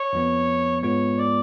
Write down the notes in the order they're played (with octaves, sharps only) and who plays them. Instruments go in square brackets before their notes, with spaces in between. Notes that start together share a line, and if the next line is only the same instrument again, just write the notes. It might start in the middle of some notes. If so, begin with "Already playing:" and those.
Already playing: [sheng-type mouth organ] C#5
[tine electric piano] F2 F3 B3
[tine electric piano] G#2 G#3 B3 F4 [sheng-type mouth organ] C#5
[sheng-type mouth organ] D5